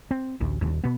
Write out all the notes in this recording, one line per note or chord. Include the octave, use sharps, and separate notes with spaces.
C4
A1 D2
D#1 D#2
B2 B3